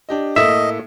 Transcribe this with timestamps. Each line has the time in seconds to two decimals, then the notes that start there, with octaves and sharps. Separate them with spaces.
0.09 D4 G4 D#5
0.36 A2 A#3 D#5 E5